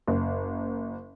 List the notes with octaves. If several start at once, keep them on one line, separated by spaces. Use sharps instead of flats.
F#1